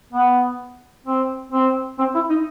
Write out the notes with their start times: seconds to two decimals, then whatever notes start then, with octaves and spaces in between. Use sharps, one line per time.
0.13 B3
1.06 C4
1.52 C4
1.98 C4
2.15 E4
2.30 D#4